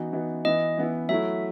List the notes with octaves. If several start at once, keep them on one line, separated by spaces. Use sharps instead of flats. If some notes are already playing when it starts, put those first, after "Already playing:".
Already playing: E3 B3 D#4 F#4
E3 B3 D#4 F#4
E3 B3 E4 D#5
E3 B3 E4
F#3 A3 E4 E5